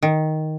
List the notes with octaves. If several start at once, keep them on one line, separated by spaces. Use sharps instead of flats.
D#3